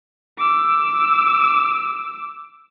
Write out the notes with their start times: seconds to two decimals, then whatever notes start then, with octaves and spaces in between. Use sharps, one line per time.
0.38 D6 E6